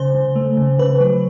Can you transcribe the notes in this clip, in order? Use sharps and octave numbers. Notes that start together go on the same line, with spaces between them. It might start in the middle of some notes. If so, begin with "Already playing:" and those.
Already playing: C#3 C5
C#3
A3
C#3
C#3 B4
F#3